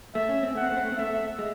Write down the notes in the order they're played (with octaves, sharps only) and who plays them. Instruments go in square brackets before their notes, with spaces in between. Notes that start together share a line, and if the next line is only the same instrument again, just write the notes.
[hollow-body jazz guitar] A3 [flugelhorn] E5
[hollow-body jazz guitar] C#4
C4
[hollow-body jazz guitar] A3 [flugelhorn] F#5
[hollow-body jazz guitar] C4
A3
C4
A3
C4
[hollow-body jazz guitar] A3 [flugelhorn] E5
[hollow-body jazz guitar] G#3